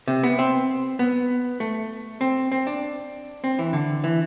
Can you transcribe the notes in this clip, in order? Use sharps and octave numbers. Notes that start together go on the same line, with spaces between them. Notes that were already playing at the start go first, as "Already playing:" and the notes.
C3
B3
C4
B3
A3
C4
C4
D4
C4
E3
D3
E3